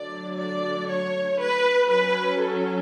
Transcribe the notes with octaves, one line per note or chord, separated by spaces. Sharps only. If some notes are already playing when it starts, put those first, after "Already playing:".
Already playing: D3 F#3 A3 D4 D5
D5
C#5
B4
F#3 C#4 B4
A4